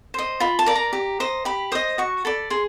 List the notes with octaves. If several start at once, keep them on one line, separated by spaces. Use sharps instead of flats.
C5 D#5
F4 B5
A5
A#4 D5
A#5
G4
C5 D#5
G4 B5
C5 D#5 D#6
F#4 C#6
A4 D5 B5
G#4 C6